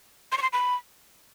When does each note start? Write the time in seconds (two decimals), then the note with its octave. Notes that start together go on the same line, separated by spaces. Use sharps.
0.32 C6
0.37 C#6
0.42 C6
0.53 B5